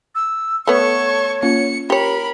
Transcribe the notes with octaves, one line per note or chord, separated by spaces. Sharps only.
E6
A3 B3 A4 C#5 C#6
A#3 C#4 F4 C#7
G4 A#4 C#5 B5